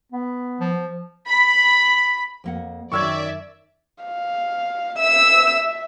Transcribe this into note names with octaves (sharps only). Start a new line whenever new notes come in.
B3
F3
B5
F2 A#3 F#5
F#2 D#3 D5 E5 C#6 E6 G#6
F5
E5 E6